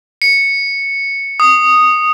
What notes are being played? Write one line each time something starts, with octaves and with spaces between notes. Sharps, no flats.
C#7
D#6